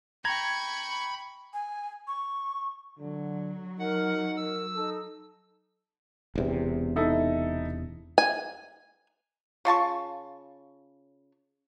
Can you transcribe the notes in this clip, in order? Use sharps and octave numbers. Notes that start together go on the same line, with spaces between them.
G5 A#5 B5 C#6 G#6
G#5
C#6
D3 F#3
D#4 A#4 F#5
A#4 E6
D#4 A4
E1 E2 C3
D#4 E4 A4
G#5
C#3 F4 A5 C#6